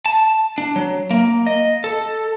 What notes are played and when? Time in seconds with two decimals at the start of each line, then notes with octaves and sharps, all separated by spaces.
0.06 A5
0.58 D4
0.76 F#3
1.11 A#3
1.47 D#5
1.84 A4